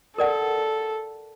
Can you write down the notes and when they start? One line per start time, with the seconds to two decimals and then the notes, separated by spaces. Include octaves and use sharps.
0.18 A4 A#4 D5 F#5